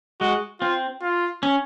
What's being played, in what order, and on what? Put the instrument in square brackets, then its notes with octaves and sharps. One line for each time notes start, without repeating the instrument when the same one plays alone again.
[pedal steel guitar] G#3 [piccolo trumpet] F#4
[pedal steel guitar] C4 [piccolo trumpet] F4
[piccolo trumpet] F4
[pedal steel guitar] C#4